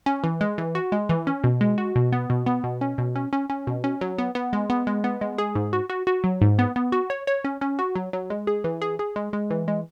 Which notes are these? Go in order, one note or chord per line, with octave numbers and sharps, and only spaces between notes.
C#4
E3
G#3
E3
F#4
G#3
E3
C#4
B2
G#3
F#4
B2
B3
B2
B3
B2
C#4
B2
C#4
C#4
C#4
B2
C#4
F#3
B3
B3
G#3
B3
G#3
B3
G#3
G#4
G#2
F#4
F#4
F#4
F#3
G#2
B3
B3
F#4
C#5
C#5
C#4
C#4
F#4
F#3
F#3
G#3
G#4
E3
G#4
G#4
G#3
G#3
E3
G#3